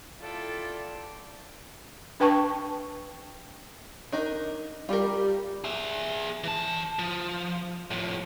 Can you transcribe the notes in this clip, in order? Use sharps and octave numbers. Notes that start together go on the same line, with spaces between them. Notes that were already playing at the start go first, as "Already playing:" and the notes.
E4 F4 A4 D5 G5
D4 B4 G5 A5 C#6
D4 D#4 A#4
G3 F4 A#4
G#4 E5
E3 A5
F3
A2 F3